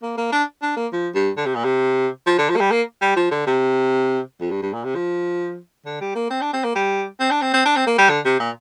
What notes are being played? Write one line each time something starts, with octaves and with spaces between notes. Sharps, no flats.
A#3
A#3
D4
D4
A#3
F3
G2
D3
C3
A#2
C3
F3
D3
F3
A#3
G3
A#3
G3
F3
D3
C3
F2
G2
G2
A#2
C3
F3
D3
G3
A#3
C4
D4
C4
A#3
G3
C4
D4
C4
C4
D4
C4
A#3
G3
D3
C3
A#2